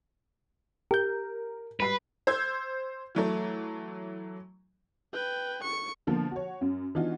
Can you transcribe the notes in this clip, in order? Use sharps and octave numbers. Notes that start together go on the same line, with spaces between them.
G4 A#4 G6
G3 B4 B5 C7
C5 E6 G6 G#6
E3 F#3 A3
B4 G5
C#6 C#7
B2 D3 F3 A#3
F#4 C#5
F#2
E3 B3 D4 D#4 F4 F#4